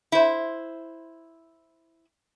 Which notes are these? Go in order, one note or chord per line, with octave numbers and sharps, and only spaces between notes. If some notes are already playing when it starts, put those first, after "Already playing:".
E4 C5